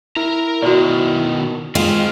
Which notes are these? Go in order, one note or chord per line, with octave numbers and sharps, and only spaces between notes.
E4 A#4 A#5
B2 D#3 F#4 B4 D5
D#3 G#3 C4 F4